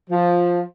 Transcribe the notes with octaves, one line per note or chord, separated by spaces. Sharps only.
F3